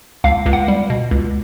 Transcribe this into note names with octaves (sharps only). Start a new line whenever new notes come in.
C#2 F5
C#2
F#5
G3
B2
C#2